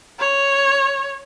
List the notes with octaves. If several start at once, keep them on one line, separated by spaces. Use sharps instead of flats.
C#5